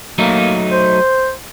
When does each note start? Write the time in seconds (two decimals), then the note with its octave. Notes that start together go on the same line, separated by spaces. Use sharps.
0.18 F#3 A3 A#3 D#4
0.72 C5